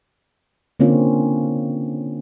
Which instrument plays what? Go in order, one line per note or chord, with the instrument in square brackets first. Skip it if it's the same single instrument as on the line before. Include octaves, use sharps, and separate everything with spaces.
[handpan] D3 A#3 C4 C#4 F4